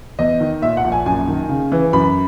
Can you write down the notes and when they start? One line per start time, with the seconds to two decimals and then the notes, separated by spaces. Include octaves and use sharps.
0.19 E2 D#5
0.40 D#3
0.62 A#2 E5
0.77 F#5
0.84 A#1
0.92 G#5
1.06 F#2 G#5
1.28 D#3
1.49 C#3
1.72 E3
1.93 F#2 B5